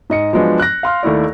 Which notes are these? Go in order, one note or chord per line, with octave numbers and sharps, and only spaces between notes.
G#2 D#5 C#7
F3 F#3 G#3 B3 D4
F#6 A#6
F5 C6 F6
D#2 A3 E4 D5